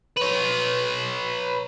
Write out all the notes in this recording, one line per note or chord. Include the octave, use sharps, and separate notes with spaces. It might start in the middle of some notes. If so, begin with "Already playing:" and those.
B4 C#5